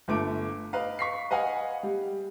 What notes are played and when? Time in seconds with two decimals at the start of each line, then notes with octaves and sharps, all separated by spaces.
0.08 G1 A3 D6 D7
0.73 B4 D#5 F5
0.99 C#6 B6 C7
1.30 B4 D#5 F5 F#5 G#5
1.83 G3